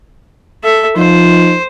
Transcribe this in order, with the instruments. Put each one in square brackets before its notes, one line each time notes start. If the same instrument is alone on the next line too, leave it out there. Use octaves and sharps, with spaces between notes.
[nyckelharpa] A4 E5
[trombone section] F3 D#4 [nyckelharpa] C5